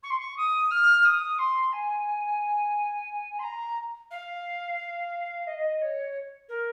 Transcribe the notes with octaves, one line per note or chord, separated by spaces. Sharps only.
C#6
C6
C#6
D#6
F6
D#6
C6
G#5
C6
A#5
F5
D#5
C#5
A#4